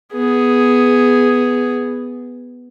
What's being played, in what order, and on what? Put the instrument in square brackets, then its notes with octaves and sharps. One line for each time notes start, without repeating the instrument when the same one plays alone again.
[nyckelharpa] B3 G#4